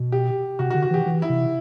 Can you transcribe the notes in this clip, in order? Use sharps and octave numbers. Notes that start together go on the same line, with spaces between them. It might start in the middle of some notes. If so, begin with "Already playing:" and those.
Already playing: B2
G4
C3 F#4
F#4
D3
F#4
E3 G4
E3
E4
C3